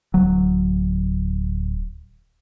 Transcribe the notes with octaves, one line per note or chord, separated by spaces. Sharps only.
D1 F#3